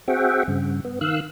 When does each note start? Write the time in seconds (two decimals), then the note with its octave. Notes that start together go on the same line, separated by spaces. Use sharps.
0.08 C4 F#4 G#4 E5 F#5 G5
0.48 G2 C#3
0.85 B3
1.01 D#3 F5 E6 F#6